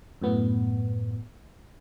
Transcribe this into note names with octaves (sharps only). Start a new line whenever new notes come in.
F#2 A2 B3